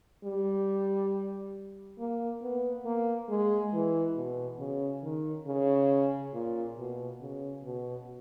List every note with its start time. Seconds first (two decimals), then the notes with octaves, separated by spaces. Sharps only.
0.24 G3
1.99 A#3
2.42 B3
2.85 A#3
3.29 G#3
3.73 E3
4.16 B2
4.59 C#3
5.03 D#3
5.47 C#3
6.34 A#2
6.78 B2
7.21 C#3
7.64 B2